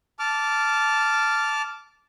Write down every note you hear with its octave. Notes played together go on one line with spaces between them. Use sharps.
A5 D6 F6